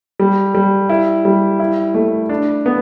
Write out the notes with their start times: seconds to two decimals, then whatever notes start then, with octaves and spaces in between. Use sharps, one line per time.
0.19 G3
0.55 G3
0.89 E4
1.25 G3
1.60 E4
1.94 A3
2.29 D4
2.66 B3